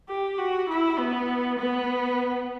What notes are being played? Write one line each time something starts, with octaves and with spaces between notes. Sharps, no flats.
G4
F#4
E4
B3
B3